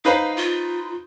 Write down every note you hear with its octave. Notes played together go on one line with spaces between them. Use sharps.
D#4 B4 C5 F5
F4